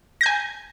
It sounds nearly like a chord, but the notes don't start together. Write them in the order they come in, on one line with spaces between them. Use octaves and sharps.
A#6 G6 G#5